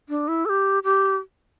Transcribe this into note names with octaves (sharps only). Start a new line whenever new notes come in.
D4
E4
A4
G4
G4